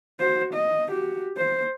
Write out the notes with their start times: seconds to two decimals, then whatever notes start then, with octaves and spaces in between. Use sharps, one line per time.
0.20 F#4 C5
0.54 D#5
0.89 F#4 G4
1.37 C5